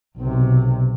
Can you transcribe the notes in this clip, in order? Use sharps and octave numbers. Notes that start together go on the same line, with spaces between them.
B1 C3